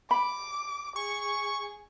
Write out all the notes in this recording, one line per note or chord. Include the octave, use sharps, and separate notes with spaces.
B5 D6
G#4 C#6